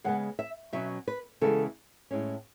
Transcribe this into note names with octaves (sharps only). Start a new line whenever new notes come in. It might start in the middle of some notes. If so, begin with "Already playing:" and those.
C#3 G#3 B3 F#5
E5
B2 F#3 C#4 E5
B4
C#3 E3 G#3 B3 A4
A2 G#3 C#4